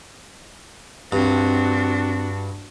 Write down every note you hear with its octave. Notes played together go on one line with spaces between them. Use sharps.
G2 C4 D4 F#4